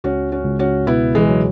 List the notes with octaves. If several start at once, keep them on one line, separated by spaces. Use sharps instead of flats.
C#2 C#4 F#4
C#4 F#4
C#2
C#4 F#4
B2 B3 E4
E3 G#3
F#3